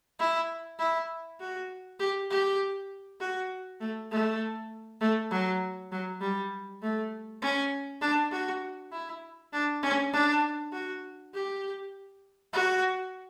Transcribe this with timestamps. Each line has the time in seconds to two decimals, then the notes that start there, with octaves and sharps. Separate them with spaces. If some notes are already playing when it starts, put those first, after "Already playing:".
0.19 E4
0.79 E4
1.40 F#4
2.00 G4
2.31 G4
3.20 F#4
3.81 A3
4.11 A3
5.01 A3
5.31 F#3
5.92 F#3
6.21 G3
6.82 A3
7.42 C#4
8.01 D4
8.32 F#4
8.92 E4
9.53 D4
9.83 C#4
10.13 D4
10.73 F#4
11.34 G4
12.53 F#4